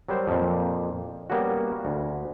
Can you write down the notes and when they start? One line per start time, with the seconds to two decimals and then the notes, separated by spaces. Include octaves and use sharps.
0.09 F#3 G3 A#4 C5
0.28 F2 A#2
1.30 G3 A#3 B3 C#4 F#4
1.85 D2